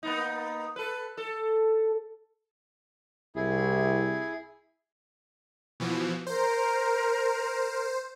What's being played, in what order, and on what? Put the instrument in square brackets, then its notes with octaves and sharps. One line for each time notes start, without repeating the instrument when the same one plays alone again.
[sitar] A#3 B3 D#4
A4 B4
A4
[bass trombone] C2 [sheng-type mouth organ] E4 G#4
[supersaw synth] B2 E3 F3
[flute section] A#4 [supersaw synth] C5